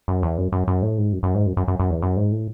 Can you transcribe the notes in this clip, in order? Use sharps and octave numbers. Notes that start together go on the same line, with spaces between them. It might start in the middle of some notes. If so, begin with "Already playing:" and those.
F#2
E2
F#2
F#2
F#2
A2
G#2
F#2
F#2
G#2
F#2
F#2
F#2
F#2
E2
F#2
G#2
A2